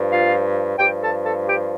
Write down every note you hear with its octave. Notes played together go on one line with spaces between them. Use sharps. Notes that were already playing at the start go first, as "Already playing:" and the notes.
Already playing: G2 F3
F4 F5
G2 F3 G4 G5
A4 A5
A4 A5
G4 G5